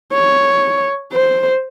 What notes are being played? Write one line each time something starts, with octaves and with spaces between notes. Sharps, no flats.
C#5
C5